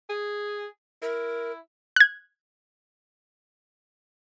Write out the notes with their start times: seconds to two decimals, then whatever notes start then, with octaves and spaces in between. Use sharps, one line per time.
0.09 G#4
1.02 E4 A#4
1.96 F#6 G#6